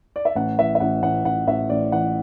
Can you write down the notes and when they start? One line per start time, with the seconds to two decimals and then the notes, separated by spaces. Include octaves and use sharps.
0.16 D5
0.25 E5
0.36 A1 F#5
0.58 E3 E5
0.75 E5
0.80 A1 F#5
1.03 A1 F#5
1.25 A1 F#5
1.47 A1 E5
1.70 A1 D5
1.92 E3 F#5